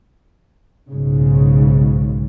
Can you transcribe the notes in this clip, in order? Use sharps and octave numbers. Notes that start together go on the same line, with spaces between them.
B1 G#2 C#3